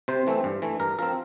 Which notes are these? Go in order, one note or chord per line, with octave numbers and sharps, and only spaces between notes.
C3 C5
E3 A3 C4
G2
E3 A3
G2 A#4
F3 C4 A#4